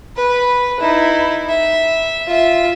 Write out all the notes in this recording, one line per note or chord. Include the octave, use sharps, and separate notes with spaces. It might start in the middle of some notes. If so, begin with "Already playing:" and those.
B4
D#4 E4
E5
F4 E5